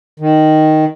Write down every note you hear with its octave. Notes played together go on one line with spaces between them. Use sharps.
D#3